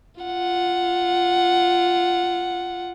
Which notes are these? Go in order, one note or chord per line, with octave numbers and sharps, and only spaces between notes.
F4 F#5